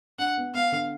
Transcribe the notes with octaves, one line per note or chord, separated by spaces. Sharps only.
D4 F#5
B3
B3 F5
D3